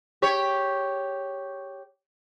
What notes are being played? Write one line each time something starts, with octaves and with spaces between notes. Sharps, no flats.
G4 C#5